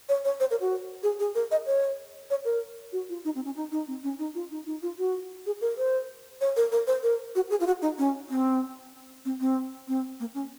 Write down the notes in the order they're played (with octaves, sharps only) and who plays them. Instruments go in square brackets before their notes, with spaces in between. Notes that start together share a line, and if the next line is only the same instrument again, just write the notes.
[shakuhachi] C#5
C#5
C5
A#4
F#4
G#4
G#4
A#4
D#5
C#5
C#5
A#4
F#4
F4
D#4
C4
C#4
D#4
D#4
C4
C#4
D#4
F4
D#4
D#4
F4
F#4
G#4
A#4
C5
C#5
A#4
A#4
C5
A#4
F#4
G#4
F4
F#4
D#4
C#4
C4
C4
C4
C4
A#3
C#4